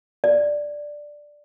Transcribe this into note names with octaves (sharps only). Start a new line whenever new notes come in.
D5